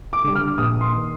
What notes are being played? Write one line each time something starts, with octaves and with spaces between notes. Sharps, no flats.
D6
D3 G3
F6
A#1 D#6
C6
D#3